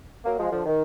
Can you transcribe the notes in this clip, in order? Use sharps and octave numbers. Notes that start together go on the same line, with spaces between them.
F#3 A#3
F3 G#3
D3 F3
D#3